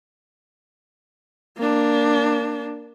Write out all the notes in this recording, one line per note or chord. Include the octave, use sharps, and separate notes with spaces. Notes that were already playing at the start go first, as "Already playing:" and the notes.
A#3 D4